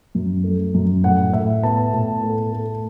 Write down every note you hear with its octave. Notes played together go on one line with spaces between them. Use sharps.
F#2
A3
F#2
A2 F#5
A2 E5
B3 A5
A2
A3
A3